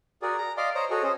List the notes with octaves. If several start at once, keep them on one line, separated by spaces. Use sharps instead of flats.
F#4 G#4 A#4 D5
A#5
D5 D#5 F5 C6 D6
C5 C#5 D#5 A#5
F#4 G#4 A4 C#5 D#5
C#4 C5 D#5